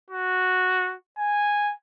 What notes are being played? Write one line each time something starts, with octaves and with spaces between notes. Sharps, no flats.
F#4
G#5